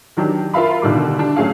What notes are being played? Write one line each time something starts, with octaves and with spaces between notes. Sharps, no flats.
D#3 F#3 D4 G4
F4 A#4 E5 F5 B5
B2 D3 D#3 G3 D6
D4 G4 A5
F#3 A3 C#4 G#4 F5